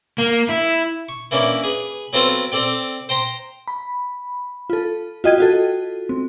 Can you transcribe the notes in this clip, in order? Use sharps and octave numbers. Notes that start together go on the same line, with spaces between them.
A#3
E4
C#6
E3 A#3 C#4 D4 E4
G#4 B4
F#3 B3 C4 F4 A4 C5
C4 A4 D5 G5
C5 G5 A#5 C6
B5
F4 A4
F4 F#4 D#5 G5 G#6 D#7
F4 F#4 A4
C4